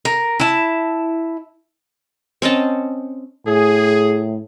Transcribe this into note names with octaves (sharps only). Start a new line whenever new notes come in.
A#4
E4 A5
C4 C#4 D#5 A5
A2 G#4